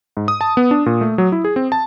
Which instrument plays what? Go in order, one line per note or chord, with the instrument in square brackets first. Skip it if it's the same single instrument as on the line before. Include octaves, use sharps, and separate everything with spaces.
[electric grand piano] G#2
D#6
A5
B3
D4
A#2
A3
F#3
E4
G#4
C4
A5